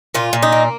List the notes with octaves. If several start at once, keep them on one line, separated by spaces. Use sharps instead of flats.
A#2 F4
A#2
D#4
A#3